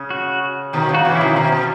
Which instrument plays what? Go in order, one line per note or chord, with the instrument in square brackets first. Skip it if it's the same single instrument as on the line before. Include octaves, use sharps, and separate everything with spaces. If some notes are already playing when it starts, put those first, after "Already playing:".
Already playing: [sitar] C#3
[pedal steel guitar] F#4
[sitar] B2 D#3
C#3
[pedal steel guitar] F#4
[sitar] C#3 E3
[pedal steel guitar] E4
[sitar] B2 D#3
[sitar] B2 [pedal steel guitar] C#4
[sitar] B2